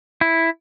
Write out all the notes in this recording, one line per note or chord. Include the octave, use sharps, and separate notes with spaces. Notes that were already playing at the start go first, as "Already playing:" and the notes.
E4